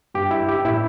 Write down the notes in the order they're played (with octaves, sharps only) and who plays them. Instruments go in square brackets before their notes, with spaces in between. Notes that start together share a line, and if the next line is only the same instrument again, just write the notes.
[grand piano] G2 [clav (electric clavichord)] G4
[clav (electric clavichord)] E4
G4
[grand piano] A2 [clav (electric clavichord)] E4